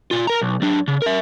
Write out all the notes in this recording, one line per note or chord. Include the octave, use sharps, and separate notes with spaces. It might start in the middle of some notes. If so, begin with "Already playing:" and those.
A#2 F4
A#4 A#5
B1
F#3 D4
C#3
A#4 E5